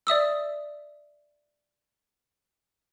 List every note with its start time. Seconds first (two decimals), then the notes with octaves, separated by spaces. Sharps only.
0.07 D5 E5 D#6 E6